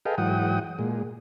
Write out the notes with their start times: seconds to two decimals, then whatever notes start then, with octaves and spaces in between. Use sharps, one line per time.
0.05 G#4 A4 B4 D#5 F5 G5
0.18 G#2 E3 F#3 F#5 G5 D#6
0.79 A#2 G#3